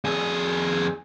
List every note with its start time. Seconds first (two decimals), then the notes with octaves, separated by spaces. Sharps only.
0.05 F2 G#4